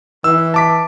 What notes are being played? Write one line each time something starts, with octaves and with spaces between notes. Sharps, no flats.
E3 E6
A5 D6 B6